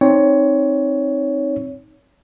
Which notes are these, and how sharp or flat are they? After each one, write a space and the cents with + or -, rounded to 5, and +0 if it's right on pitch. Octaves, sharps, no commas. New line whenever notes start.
C4 +20 D#4 +0 C#5 +20